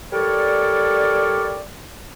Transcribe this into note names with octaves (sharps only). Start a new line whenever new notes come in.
G3 A4 A#4 C#5 D5